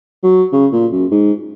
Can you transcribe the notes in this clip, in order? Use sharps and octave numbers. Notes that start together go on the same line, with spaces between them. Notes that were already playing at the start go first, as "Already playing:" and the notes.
F#3
C#3
A#2
F#2
G#2